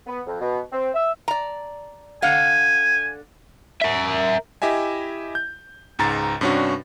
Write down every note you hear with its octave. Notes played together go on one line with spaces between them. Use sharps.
B3
F2
B2
C4
E5
D5 A#5
D3 F5 F#5 G#5
A#4 E5
E4 G4 D#5 E5 G#5
G6
C#2 G#2 A#5 A6
G2 C3 C#4 D4 F#4